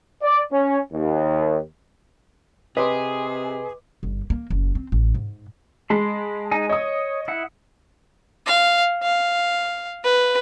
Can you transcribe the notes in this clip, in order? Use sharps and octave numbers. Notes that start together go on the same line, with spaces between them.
D5
C#4
D#2
C3 G#4 B4 D#5 C6 D6
G1
A#3
F#1
C4
A1
G#2
G#3 A5 B5 C6
D#4 G#5
C#5 D#5 D#6
E4 F#5
F5
F5
B4